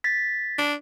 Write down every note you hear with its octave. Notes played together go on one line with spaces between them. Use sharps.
A6 B6
D4